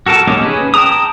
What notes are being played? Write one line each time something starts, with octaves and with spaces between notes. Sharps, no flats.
F#4 A4 A#4 A5
G#3 A#3 C#4 D#4 G4
C#4 G#4 B4
G5 A5 A#5 D#6